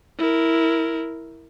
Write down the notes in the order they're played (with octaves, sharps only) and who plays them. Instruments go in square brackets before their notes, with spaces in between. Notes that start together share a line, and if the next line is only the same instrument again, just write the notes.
[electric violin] E4 A#4